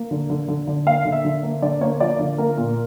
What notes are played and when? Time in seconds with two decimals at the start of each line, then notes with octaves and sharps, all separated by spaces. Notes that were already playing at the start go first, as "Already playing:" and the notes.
Already playing: A#3
0.11 D3
0.30 D3
0.48 D3
0.67 D3
0.86 A#3 F5
1.05 D3
1.12 E5
1.25 D3
1.43 A#3
1.62 D3 D5
1.81 A#3 C#5
2.00 F3 D5
2.19 D3
2.38 A#3 A#4
2.57 A#2